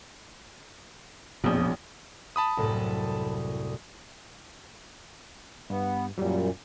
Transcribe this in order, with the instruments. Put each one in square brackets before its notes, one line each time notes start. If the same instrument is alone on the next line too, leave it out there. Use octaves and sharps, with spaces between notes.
[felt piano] E1 A#1 F2 [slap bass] B2 F3
[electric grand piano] A5 B5 D#6
[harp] C2 F#2 A2
[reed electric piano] G2 [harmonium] B3
[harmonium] F#2 A#2 [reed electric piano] F#3 G3